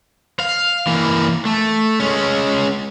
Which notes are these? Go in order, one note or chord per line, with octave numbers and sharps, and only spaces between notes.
F5
E3 A#3
A3
G#3 C#4